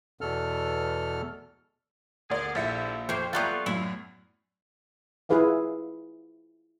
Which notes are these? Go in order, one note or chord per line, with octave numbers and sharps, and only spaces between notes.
E2 B2 A4 F6
D2 F3 G#4 A#4 D5
A#1 D3 G3 E4 E5 C#7
F2 A#3 C5 C#5
F#3 G3 A3 B3 F4 C#6 F#6 A6
F#2 A2 E4
E4 F4 G#4 B4 F5 F#5